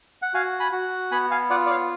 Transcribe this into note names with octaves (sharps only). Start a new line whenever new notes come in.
F#5
F#4 F5 G#5
G#5 B5
F#4
B3 G#5 B5
F5 G#5
F4 D5 F#5
D5
C#5 F5